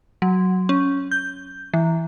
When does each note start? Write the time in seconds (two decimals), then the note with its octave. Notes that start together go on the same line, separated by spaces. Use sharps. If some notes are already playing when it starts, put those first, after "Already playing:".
0.22 F#3
0.69 C#4
1.11 G6
1.74 E3